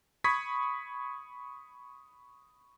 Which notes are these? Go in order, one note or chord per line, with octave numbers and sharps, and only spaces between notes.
B5 C#6 D#6 G#6 B6